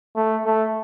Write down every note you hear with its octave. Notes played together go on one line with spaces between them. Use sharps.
A3
A3